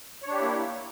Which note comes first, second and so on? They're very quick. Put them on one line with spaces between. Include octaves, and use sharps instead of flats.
C#5 D4 G4 E4 A#3